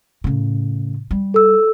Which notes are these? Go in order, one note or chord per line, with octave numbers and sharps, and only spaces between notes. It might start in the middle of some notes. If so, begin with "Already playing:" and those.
A2 C#3
G3
A4 E6